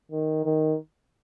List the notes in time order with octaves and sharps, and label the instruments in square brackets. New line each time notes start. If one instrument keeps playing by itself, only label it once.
[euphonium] D#3
D#3